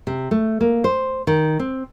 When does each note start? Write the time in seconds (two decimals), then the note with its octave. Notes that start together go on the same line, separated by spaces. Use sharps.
0.07 C3
0.31 A3
0.61 A#3
0.84 C5
1.27 D#3
1.59 C4